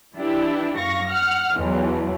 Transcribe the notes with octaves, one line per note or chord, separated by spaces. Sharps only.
E3 D4 E4 G4
F#2 F5 C#6 A#6
F#5 F6
B1 E2 E3 F#3